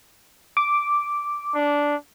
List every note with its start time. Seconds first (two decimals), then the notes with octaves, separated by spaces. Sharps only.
0.57 D6
1.55 D4